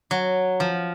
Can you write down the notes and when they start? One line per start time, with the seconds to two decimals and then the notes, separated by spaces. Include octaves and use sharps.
0.11 F#3
0.60 F3